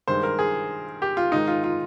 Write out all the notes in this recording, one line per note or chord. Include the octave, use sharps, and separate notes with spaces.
G2 D#3 G#3 C5
A#4
G#4
G4
F4
G#2 D#3 G#3 D#4
F4
F4